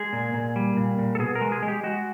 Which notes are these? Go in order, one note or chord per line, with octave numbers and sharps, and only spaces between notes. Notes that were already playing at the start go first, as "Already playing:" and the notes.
Already playing: G#3 G#4
A#2
A#2
G3
A#2
A#2
A4
B2 G#4
A#4
G#3
G#4
G#3
G4
G#3 F#4